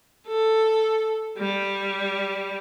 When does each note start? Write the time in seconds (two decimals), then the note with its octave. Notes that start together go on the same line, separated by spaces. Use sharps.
0.27 A4
1.38 G3